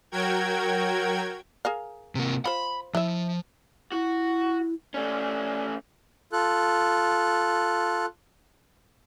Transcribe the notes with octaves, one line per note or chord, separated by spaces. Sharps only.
F#3 F#4 A#4 G5 G#6
G#4 A#4 F5
C3 A#3
F4 C5 B5
F3 E4 E5
E4 F#4
A3 C#4 D5
F4 A4 F#6